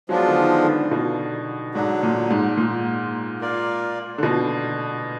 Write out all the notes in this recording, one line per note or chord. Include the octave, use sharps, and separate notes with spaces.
F3 F#3 G#3 B3 D4 F4
D3
D#3
D3
B2
G#2 D3 F#3 D4 F#4
A#2
G#2
A#2
A#3 F4 A#4 D5
D3
B2